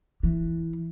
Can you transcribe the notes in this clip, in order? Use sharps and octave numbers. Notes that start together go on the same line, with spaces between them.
E3